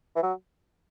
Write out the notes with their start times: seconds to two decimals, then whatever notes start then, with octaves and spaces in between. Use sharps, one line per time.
0.16 E3
0.23 F#3